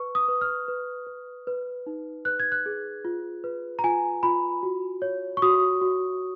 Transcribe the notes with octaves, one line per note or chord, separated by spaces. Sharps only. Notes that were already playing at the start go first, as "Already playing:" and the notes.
Already playing: B4 C#6
D#6
B4
F6
B4
B4
B4
D#4
B4 F#6
G#6
F#6
G#4
F4
B4
A#5
F4 G#5
F4 B5
F#4
C#5
C#6
F#4 D#6
F#4